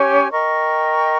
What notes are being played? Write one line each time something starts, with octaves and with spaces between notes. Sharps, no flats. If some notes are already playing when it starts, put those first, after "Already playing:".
Already playing: C#4 G4 C#5 G#5
A#4 D#5 G5 C#6